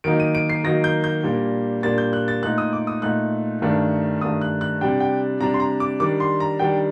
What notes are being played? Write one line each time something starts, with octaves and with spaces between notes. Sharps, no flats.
D#3 F#3 A#3 D#4 D7
D#7
D7
C7
D#3 F#3 A#3 D#4 A#6
G6
G6
A#2 G3 A#3 D4
A#2 G3 A#3 D4 A6
G6
F#6
A6
A#2 A3 D#4 F#6
D#6
D6
D#6
A#2 A3 D#4 F#6
G2 D#3 A3 D4
G2 D#3 A3 D4 D#6
F#6
F#6
C3 G3 D4 G5
G5
C3 G3 D4 A#5
C6
A#5
D6
D#3 G3 D4 D6
C6
A#5
D#3 G3 D4 G5